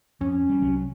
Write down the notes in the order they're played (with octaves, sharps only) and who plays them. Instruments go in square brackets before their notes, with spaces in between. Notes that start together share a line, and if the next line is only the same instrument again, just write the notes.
[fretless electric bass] F2 [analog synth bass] C#4
[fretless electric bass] G3
C2 F#3